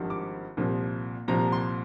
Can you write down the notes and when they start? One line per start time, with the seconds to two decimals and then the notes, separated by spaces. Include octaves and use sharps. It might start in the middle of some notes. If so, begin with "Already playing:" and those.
Already playing: G#1 G2 F3
0.10 D6
0.57 C2 A#2 F3
1.28 C2 A#2 F3 A#5
1.52 C6